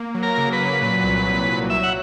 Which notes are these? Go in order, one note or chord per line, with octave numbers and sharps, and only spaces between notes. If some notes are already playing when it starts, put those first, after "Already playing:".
Already playing: A#3
F#3
A#4
C#3
B4
F#3
A#2
C2
C2
C2
F#3 E5
F#5